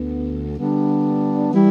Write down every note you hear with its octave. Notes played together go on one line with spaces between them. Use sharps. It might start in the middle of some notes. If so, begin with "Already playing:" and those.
Already playing: D2 D3 B3
D3 G3 B3 D4
E3 G3 E4